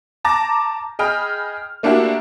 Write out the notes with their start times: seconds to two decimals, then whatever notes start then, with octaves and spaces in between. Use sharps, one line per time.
0.25 A5 A#5 D6 A6 A#6
0.99 G#4 D#5 G5 B5 F6
1.83 A3 A#3 D4 E4 F#4 G4